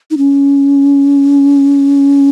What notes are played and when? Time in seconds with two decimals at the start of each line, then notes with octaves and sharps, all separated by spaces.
0.11 D#4
0.18 C#4